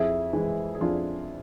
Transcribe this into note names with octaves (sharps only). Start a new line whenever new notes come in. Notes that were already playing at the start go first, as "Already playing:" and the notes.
Already playing: F2 E4 G#4
E3 G#3
G#4
F2 D4 F4